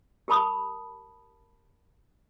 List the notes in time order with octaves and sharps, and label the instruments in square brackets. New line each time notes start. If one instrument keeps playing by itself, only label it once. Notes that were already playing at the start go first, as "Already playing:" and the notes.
[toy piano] G4 A#4 A5 B5 D#6